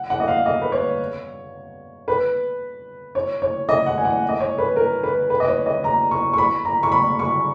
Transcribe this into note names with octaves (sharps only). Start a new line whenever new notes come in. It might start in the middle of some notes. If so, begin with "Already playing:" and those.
Already playing: F#5
F#5
D#5
F5
D#5
B4
C#5
B4
C#5
C#5
D#5
F#5
G#5
F#5
D#5
C#5
B4
A#4
B4
B4
D#5
C#5
D#5
A#5
C#6
C#6
B5
A#5
C#6
B5
C#6